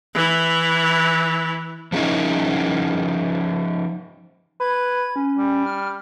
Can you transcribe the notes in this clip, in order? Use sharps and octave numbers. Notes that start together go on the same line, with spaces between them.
E3 E4
F3 F#3 A3 C#4 D#4 E4
B4 G#6
C#4
G3
F6